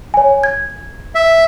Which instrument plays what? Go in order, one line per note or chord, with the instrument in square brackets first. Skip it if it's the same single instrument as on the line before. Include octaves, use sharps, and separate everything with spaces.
[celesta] C#5 G#5
G#6
[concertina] E5